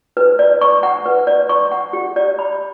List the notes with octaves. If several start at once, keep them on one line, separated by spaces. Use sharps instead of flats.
B4
D5
C#6
F#5
B4
D5
C#6
F#5
G4
D5
B5